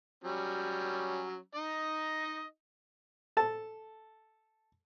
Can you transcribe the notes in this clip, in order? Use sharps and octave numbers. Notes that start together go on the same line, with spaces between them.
F#3 G3 C#4
D#4 D#5
A4 A5